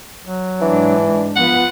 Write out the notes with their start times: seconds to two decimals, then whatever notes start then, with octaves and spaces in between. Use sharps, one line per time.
0.24 F#3
0.61 G#2 E3 G#3 D4
1.36 F3 B3 F4 B4 F#5